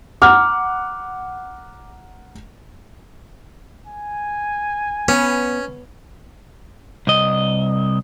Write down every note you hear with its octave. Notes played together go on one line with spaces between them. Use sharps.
F#5 A#5 D6 F6
G#5
B3 C#4
C2 D#5